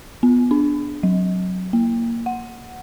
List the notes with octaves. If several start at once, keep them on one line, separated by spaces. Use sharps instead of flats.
B3
D4
F#3
A#3
F#5